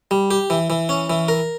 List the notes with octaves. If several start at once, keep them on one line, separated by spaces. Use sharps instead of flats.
G3
G4
E3
E3
C#4
E3
A#4